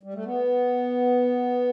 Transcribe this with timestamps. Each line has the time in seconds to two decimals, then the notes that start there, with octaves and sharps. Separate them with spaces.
0.03 G3
0.14 A3
0.25 B3